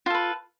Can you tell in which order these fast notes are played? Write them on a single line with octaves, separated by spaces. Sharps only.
F4 A4 B4